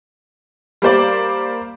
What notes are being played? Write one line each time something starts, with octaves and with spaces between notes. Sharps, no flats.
G3 A#3 C5 D5